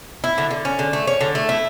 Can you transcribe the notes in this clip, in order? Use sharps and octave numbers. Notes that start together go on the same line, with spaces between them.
E4
D3
D3
C#4
D3
A3
C#4
D3
A3
E4